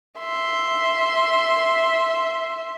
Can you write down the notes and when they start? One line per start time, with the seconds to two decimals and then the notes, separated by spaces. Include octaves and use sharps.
0.19 E5 C6